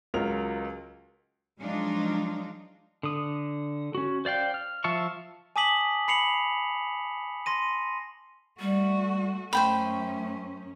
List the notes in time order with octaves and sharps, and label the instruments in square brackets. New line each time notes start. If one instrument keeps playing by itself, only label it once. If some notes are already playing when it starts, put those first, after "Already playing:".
[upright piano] C#2 F#3 F4 A#4 F7
[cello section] F3 F#3 G#3 D4 D#4 F4
[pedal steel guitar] D3 D#6
C#4 F#4
C5 D5 F5 G5
F6
F3 E5 F5 A5 C#6
[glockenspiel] G#5 A5 D6 D#6 B6 F#7
B5 C7 C#7 F7 F#7
C6 A#6 D#7
[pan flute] G3 [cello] A3 F#4
[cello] F#2 C#4 [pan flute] A3 [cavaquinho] C5 G5 B5